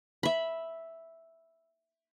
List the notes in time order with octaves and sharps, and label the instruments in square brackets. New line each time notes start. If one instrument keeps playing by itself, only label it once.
[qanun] E5 B5